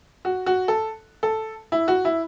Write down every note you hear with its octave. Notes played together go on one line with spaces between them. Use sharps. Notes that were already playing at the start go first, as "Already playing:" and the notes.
F#4
F#4
A4
A4
E4
F#4
E4